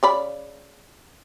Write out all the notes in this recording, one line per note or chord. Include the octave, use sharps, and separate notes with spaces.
C#3 D5 B5